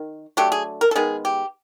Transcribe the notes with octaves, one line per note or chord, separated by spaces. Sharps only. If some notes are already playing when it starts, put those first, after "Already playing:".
Already playing: D#3
D3 F#3 A3 G4
G#4
A#4
A4
D#3 G#3 B3 G#4
G4